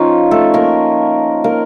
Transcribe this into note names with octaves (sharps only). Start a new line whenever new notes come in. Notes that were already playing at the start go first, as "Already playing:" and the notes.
Already playing: F3 C#4 D#4 F4
A3 A4
A#3 A#4
A#3 A#4